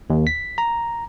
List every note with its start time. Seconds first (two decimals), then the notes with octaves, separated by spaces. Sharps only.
0.10 D#2
0.27 B6
0.58 A#5